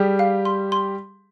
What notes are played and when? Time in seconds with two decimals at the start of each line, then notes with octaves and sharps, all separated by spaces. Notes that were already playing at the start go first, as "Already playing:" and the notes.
Already playing: G3 G4 G#4
0.19 F5
0.45 C6
0.72 C6